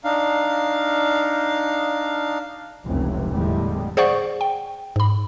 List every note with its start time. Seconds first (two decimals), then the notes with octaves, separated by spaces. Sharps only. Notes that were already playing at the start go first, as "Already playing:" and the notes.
0.04 D4 D#4 F5
2.85 F1 C#2 C3 E3
3.30 E2 A2 D3 G3 G#3
3.97 G#4 C5 D5 F#5 C#6
4.41 G5
4.96 G#2 B5